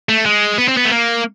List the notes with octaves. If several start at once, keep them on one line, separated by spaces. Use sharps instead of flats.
A3
G#3
B3
C4
B3
A3
A#3